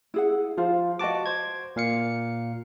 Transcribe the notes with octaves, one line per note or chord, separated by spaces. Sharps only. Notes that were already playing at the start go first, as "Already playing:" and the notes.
E4 G#4 F#5
F3 F4 C5 F5
F#4 B4 D#5 A5 D6
C5 G#6
A#2 F5 C#7